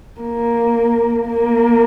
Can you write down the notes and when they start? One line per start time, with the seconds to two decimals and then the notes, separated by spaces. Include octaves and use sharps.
0.21 A#3
1.27 A#3